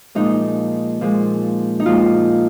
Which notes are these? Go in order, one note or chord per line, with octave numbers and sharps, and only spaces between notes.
A#2 F3 G#3 D#4
A#2 F3 G#3
D#4
A#2 F3 G#3 F4